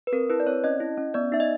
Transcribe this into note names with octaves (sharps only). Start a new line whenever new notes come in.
B4
C4 A#4
E4 B4
D5
C4 C#5
C#4 D#5
E4
C#4
B3 D5
D#4 E5
D#5